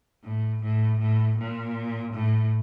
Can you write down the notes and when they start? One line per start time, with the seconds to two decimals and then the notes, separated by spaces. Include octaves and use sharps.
0.24 A2
0.62 A2
0.99 A2
1.37 A#2
2.13 A2